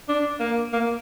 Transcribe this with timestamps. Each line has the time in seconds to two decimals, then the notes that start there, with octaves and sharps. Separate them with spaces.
0.09 D4
0.40 A#3
0.73 A#3